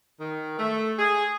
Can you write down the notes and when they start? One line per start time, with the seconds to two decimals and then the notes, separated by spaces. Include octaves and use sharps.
0.20 D#3
0.58 A3
0.99 G#4